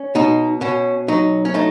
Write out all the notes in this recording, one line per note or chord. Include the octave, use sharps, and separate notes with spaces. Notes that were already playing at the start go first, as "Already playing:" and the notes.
Already playing: C#4
B2 D#4
B2 C#4
F#3 D#4
C#4
A3 D#4